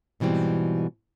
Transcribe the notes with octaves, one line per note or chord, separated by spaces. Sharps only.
G#2 B2 E3 G3 C4